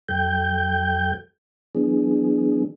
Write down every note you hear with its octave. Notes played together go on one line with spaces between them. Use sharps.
F2 F#3 A4 G5 G6
E3 F#3 B3 D4 G#4